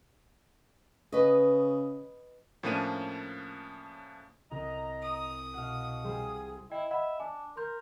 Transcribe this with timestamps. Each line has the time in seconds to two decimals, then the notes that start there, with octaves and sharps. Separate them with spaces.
1.12 C#3 B4 D#5
2.63 A2 F3 A#3 C#4 D4 D#7
4.51 C2 D#5 A#5
5.02 D#6
5.54 B2 F5 F#5
6.04 G3 G#4 C5
6.72 E4 D#5 G5
6.91 D#5 E5 F#5 B5
7.20 D4 G#5
7.57 A#4 C6 G6